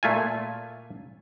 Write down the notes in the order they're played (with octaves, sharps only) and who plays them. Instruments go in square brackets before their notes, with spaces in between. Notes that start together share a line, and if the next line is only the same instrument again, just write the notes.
[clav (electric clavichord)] A#2 A3 F4 G#5